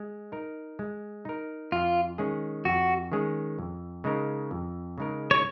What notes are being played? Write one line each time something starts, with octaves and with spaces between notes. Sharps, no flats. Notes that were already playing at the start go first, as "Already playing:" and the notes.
Already playing: G#3
D#4 A#4
G#3
D#4 A#4
F2 F4
D#3 G#3 C#4 G#4
F2 F#4
D#3 G#3 C#4 G#4
F2
C#3 G#3 D#4 A#4
F2
C#3 G#3 D#4 A#4
C#5